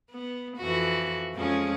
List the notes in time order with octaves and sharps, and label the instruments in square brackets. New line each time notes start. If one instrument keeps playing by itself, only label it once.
[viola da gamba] B3
F2 E3 F#4
F2 G#3 C#4